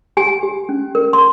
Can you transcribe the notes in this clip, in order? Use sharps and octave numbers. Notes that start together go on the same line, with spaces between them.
G4 G#5
G4
C#4
A#4
C6